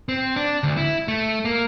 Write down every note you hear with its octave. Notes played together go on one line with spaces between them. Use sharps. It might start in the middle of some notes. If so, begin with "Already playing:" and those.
C4
D4
D2
E4
A3
A#3